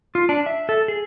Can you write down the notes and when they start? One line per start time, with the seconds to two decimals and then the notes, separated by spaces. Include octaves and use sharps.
0.15 F4
0.29 D4
0.46 E5
0.69 A4
0.88 G#4